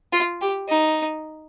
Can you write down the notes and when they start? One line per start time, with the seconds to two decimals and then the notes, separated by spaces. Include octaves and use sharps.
0.13 F4
0.41 G4
0.69 D#4